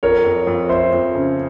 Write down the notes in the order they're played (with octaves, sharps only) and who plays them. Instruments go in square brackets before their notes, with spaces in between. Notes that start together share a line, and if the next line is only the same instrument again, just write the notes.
[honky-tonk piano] F2 [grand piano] A#4 C#5
[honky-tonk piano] F2
F2
[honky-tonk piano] F2 [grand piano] C5 E5
[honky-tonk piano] F2
C#3